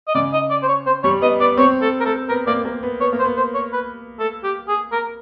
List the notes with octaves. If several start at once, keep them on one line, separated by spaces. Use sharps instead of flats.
D#5
C#3 D5
D#5
D5
C5
C#5
C5
G3 C#5
B3 D#5
B3 D5
C4 C#5
A4
A#4
A4
B3 A#4
A#3 D5
A#3
B3
B3 C#5
A#3
C5
B3
C5
C#5
B4
A4
G4
G#4
A#4